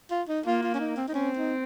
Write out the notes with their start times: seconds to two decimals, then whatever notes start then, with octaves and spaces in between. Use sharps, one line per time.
0.10 F4
0.29 D#4
0.45 A#3 F4
0.63 F4
0.74 C#4
0.79 D#4
0.96 C4
1.08 D#4
1.14 C4 C#4
1.37 D#4